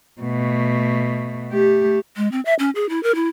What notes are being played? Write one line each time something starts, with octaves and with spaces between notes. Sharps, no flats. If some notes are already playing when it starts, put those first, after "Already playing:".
B2 A3
A3 G4
G#3
C4
E5
C#4
G#4
E4
A#4
E4